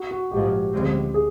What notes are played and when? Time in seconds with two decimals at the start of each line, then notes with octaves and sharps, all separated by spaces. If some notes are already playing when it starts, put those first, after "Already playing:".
Already playing: F#4
0.11 F#4
0.31 A#1 G#2 F3 G#3 G4
0.73 D2 C#3 F3 G#3 C4
1.14 G#4